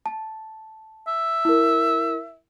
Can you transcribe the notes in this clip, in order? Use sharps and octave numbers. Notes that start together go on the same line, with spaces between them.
A5
E5
E4 A#4